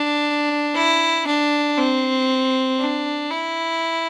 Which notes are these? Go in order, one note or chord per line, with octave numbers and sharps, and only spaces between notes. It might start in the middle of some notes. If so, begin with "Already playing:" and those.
Already playing: D4
E4
D4
C4
D4
E4